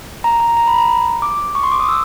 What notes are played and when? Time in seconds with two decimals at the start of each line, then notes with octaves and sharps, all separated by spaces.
0.24 A#5
0.40 A#5
0.57 A#5
0.67 B5
0.78 A#5
1.22 D6
1.55 C#6
1.63 C6
1.72 D6
1.80 D#6
1.89 E6